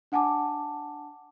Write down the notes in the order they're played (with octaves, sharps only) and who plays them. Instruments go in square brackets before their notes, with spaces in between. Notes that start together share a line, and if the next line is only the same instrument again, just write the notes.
[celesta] D4 F#5 G#5 A5 D6